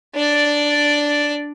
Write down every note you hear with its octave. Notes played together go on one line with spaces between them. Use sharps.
D4 D5